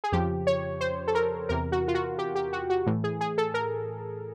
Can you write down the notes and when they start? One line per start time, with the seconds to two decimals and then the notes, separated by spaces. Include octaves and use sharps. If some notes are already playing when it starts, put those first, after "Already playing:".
0.04 G#4
0.12 F2 C#3 F3 G4
0.47 C#5
0.81 C5
1.08 A4
1.15 A#4
1.49 E2 C3 E3 A#4
1.72 F#4
1.88 F4
1.95 F#4
2.19 G4
2.35 G4
2.53 F#4
2.70 F#4
2.86 A2 E3
3.04 G#4
3.21 G#4
3.38 A4
3.54 A#4